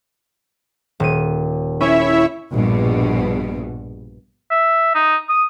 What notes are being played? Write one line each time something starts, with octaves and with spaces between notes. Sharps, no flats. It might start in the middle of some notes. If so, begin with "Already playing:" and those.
D#1 D#7
C#4 E4 C#5 E5
A#1 G2 B2
E5
D#4
D#6